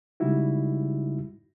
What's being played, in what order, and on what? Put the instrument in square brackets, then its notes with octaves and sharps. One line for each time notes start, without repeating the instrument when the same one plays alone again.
[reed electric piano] C#3 G3 G#3 D#4 E4 F#4